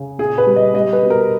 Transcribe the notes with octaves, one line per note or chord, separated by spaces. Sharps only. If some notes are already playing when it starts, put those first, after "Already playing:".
Already playing: C#3
A#2 G#4
B4
G3
D#5
G3 D#5
B4
B2
A#4